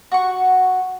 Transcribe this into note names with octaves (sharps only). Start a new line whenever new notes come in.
F#4 C#6